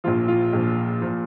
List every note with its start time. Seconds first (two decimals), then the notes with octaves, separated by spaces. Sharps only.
0.04 A#1 A#2 F3 F4
0.28 F4
0.53 A#1 A#2 F3
1.01 A#2 F3